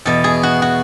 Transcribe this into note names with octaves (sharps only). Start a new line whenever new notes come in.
E2 B2 A4
G#4
F#4
F#4